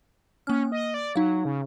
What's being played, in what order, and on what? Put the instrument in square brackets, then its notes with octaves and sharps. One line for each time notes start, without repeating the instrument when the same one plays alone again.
[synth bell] A#3 F6 [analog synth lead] C#4
[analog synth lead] D#5
D5
[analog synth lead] F#3 [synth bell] D#4 F5
[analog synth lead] C#3